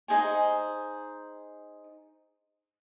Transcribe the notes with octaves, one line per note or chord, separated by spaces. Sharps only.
D#4 G#4 C5 G#5